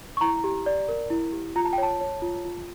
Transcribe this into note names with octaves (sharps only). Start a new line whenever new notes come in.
C#6
E4 A#5
G4
D5
A#4
E4
G4
F4 A#5
A5
G5
C#5 A5
C#5
F4
F4